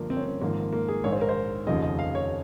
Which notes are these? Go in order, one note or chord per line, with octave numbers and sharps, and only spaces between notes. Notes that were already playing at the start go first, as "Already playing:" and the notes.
Already playing: G1 G2 F3 A#3
C4
C#4
C4
G#1 G#2 F3 A#3
A#3
G#4
A#1 G#2 D#3 C#5
C5
A#4
C5
F1 D#2 C#3 F3 D#5
D#5
F5
C#5